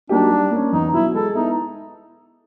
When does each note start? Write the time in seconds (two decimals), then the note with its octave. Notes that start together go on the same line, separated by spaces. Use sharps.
0.09 F#3 A#3 D4 D#4 G4
0.31 G3
0.51 A#3 C#4
0.72 E2 D#4
0.93 B2 F#3 E4
1.14 G#3 A4
1.35 B3 D#4 E4